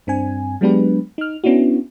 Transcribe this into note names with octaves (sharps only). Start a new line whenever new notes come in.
G2 C4 D4 G#5
F#3 G#3 B3 D4 G4 B4
D#4 F6
B3 C#4 D4 E4 F#4